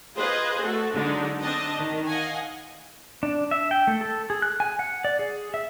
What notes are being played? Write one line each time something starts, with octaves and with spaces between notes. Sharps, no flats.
F4 G#4 B4 C5 D#5
A3 F#4 A4
D3 F#3 G#3 D4 D#4
C4 D4 D#5 A5
D#3
D#5 F5 F#5 G#5
D4
E5
G5
A3
A4
G#4
F#6
G#5
F#5
D5
G#4
E5